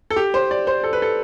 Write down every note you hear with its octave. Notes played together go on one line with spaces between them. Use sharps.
A4
G4
C5
D5
C5
A4
B4
A4